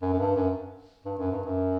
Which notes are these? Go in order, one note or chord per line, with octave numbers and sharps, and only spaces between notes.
F#2
F#2
G2
F#2
G2
F#2
G2
F#2